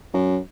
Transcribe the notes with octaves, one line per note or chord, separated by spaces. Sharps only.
F#2